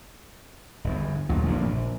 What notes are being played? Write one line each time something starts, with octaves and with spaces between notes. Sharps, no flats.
G1 E2
A1 D#2 A#2 F#3
F1 A#1 G2 D#3
A#1